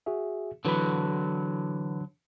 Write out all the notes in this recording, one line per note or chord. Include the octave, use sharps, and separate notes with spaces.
F#4 G#4 E5
D3 E3 F#3 B4 B5